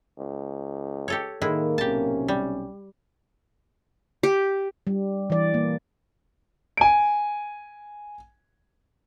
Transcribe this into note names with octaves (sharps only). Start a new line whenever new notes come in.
C#2
G4 A4 C#5
A2 D#3 G#3 A#3 E4
B1 C3 C#4 G4 A5
G3
G4
G3
E3 D5
A#3
G#5 D7